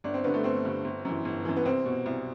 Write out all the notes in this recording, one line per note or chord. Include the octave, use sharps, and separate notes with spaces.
G1 D4
C4
G2 D3 B3
A3
G1 C4
G2 D3
G1
F#2 E3
G1
F#2 E3
B3
C2 C4
B2
C2